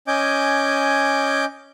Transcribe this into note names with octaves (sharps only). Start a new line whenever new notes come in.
C#4 D#5 G#5 D6 G6